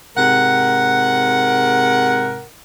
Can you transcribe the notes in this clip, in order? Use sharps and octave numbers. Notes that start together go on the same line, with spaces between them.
G#2 C3 A#4 F#5